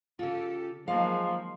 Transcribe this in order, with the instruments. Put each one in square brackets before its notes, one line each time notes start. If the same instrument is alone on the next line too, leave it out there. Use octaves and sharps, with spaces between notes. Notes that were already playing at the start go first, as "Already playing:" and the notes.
[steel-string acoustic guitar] C#3 F4 [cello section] G4 A4
[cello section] D#3 F#3 A#3 [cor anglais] F3 [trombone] G#3 [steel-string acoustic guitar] F5